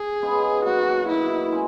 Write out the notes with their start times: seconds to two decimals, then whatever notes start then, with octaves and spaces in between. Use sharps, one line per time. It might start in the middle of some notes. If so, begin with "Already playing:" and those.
Already playing: G#4
0.22 C#3 G#3 B3 D#4
0.65 B2 F#3 A#3 D#4 F#4
1.09 B2 F#3 A#3 D#4 E4
1.52 C#3 G#3 C#4